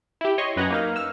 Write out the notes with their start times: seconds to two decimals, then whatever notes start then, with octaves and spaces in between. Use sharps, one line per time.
0.21 E4 G4
0.38 C#5 D#5 C6 C#6
0.56 F#2 B4 D#5 F#5 G#5 A#5
0.70 A#3 D#4 F5
0.96 E6 F6